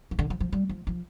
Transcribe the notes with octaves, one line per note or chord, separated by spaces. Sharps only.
E3
D3
F3
F3
G3
F3
F3